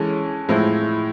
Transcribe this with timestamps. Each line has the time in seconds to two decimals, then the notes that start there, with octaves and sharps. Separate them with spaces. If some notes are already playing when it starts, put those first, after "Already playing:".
Already playing: E3 G#3 C#4 A4
0.49 A2 F3 G#3 C4 E4